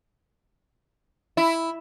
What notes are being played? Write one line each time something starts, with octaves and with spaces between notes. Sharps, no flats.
E4